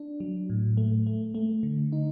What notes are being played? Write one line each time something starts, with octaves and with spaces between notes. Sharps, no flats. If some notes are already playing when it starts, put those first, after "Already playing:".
Already playing: D4
F#3
A2
A3
A3
A3
D3
D#4